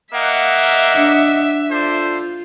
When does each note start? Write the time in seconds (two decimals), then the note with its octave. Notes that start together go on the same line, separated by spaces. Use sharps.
0.14 A#3 D#5 E5 F#5
0.94 D4
1.71 F4 A4 C5 D5